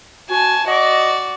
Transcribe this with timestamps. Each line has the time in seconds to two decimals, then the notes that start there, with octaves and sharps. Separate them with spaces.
0.30 F#4 G#5 A5
0.67 F#4 D5 D#5